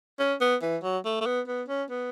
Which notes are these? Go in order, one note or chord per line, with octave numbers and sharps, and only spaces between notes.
C#4
B3
E3
F#3
A3
A3
B3
B3
C#4
B3